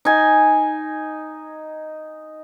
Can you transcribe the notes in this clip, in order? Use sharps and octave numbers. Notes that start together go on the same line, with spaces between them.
D#4 G#5